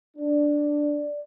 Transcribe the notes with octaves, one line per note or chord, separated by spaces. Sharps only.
D4 D5